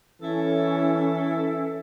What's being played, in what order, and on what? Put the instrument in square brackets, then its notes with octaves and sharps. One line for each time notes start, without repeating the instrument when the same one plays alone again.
[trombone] E3 [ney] C#4 [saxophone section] E4 A4